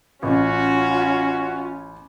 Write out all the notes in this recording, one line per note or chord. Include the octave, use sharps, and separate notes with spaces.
A1 C#4 F4 F#4